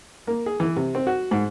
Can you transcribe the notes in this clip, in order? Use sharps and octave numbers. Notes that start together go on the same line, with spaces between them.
A#3
G#4
E3
C3
C4
F#4
G#2